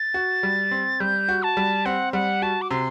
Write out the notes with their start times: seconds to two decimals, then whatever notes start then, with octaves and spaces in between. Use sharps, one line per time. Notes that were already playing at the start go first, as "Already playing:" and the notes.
Already playing: A6
0.14 F#4
0.43 G3
0.71 C4
1.00 G3 G6
1.29 F#4
1.43 A5
1.57 G3
1.85 C4 F#5
2.13 G3 F#5
2.42 F#4 A5
2.62 D6
2.71 C3 C6